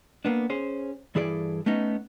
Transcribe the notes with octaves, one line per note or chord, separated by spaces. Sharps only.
A#3 B3 D4
C#4 G#4 C5
G2 E3 E4 G#4 A4 D5
A3 B3 C#4 D#4